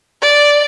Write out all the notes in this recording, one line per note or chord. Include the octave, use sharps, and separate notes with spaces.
D5